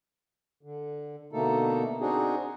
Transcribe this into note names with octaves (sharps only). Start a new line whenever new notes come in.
D3
B2 D3 A3 A#3 D#4 A4
C4 D4 D#4 F#4 G#4